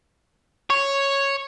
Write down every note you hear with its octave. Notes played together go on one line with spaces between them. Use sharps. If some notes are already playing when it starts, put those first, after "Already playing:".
C#5